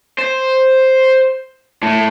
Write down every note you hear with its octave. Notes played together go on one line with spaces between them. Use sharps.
C5
A2